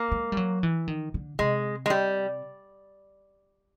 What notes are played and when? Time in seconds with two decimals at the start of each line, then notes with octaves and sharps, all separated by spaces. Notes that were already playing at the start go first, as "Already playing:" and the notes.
Already playing: A#3
0.12 G#3
0.32 G3
0.37 F#3
0.63 E3
0.88 D#3
1.14 D3
1.39 C3 G#3
1.86 G#3
1.90 G3